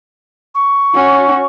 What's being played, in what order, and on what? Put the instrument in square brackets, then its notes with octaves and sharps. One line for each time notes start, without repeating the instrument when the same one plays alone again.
[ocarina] C#6
[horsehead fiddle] C#4 F#4